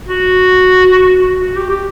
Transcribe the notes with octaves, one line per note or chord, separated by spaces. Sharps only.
F#4
F#4
G4
G4